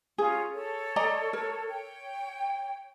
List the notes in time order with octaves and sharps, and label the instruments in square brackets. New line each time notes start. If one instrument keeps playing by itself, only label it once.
[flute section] C#4 F4 [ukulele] G#4
[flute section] A4 C#5
[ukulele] D5 D#5 A#5
A#4
[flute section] C#5 G5